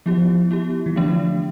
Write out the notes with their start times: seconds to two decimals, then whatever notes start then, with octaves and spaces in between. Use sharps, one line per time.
0.06 F3 B3 E4 G4
0.51 B3 E4 G4
0.86 E3
0.96 D3 F3 A3 D4